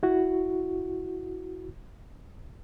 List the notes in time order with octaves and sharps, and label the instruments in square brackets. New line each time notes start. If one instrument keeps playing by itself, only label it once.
[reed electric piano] E4 F#4